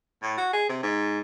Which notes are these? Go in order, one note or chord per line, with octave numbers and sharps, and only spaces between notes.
A2
F#4
G#4
C3
G#2